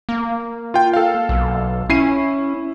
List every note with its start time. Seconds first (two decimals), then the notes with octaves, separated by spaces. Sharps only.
0.09 A#3
0.74 F4 G5
0.93 A4 F5
1.29 B1
1.90 C#4 E4 C7 D#7